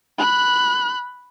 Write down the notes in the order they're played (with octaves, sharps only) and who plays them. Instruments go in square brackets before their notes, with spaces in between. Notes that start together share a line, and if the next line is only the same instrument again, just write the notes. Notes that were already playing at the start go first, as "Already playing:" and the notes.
[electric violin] B5 F#6